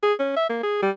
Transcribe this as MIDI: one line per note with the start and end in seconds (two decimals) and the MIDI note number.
0.03 0.13 68
0.19 0.34 61
0.36 0.47 76
0.49 0.61 58
0.63 0.80 68
0.82 0.90 55